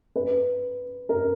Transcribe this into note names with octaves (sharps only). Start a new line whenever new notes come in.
B4
A#4